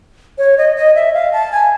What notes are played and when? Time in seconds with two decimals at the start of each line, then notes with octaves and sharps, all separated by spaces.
0.38 C#5
0.58 D#5
0.76 D#5
0.95 E5
1.14 F5
1.33 A5
1.52 G#5